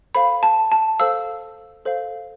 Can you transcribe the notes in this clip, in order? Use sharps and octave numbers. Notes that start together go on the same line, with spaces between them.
A4 C5 F5 B5
A5
A5
A4 C5 F5 E6
A4 C5 F5